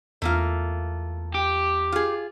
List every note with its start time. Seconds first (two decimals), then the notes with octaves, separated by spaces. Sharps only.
0.22 E2 A3 A#3 F4
1.34 G4
1.92 F4 G#4